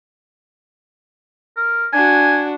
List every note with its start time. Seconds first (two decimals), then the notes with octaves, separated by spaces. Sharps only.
1.57 A#4
1.93 D4 F#4 G#5